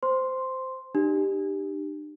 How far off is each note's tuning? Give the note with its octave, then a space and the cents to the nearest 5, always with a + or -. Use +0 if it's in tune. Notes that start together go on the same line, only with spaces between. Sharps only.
C5 -10 C6 +0
D4 +45 G4 +0